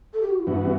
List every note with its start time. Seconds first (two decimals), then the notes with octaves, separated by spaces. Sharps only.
0.14 A4
0.22 G4
0.31 F#4
0.40 E4
0.47 G2 E3 B3 D4 F#4
0.63 C#4